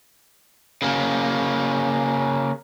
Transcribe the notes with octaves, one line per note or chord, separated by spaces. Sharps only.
C#3 A#3